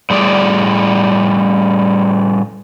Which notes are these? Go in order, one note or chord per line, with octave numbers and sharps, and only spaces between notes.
A2 G3 G#4 D5